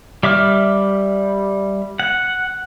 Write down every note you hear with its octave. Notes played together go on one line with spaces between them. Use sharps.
G3 E5 D6 F6
F#5